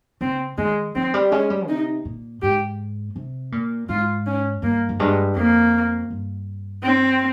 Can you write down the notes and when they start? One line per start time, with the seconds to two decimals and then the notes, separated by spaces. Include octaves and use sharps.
0.21 C#3 C4
0.58 D#3 G#3
0.95 F3 C4
1.14 G3
1.31 G#3 C#4
1.50 G3
1.68 C3 D#4
2.05 A#2
2.42 G#2 G4
3.16 C3
3.52 A#2
3.89 G#2 F4
4.26 C#4
4.62 G2 A#3
4.89 F2
5.00 G2 G#3
5.36 F2 A#3
6.10 G2
6.83 C4